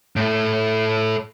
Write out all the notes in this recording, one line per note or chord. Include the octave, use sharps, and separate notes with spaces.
A2 A3